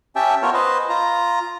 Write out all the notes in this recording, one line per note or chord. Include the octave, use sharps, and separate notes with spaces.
C#4 G4 E5 G5 A5
B3 F4 A#4 C#5
B4 C5 D#5
F4 A#5